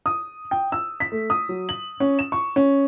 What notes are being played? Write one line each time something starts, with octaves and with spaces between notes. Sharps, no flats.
D#6
G5
E6
B6
A3
D#6
F#3
F#7
C#4
E7
C#6
C#4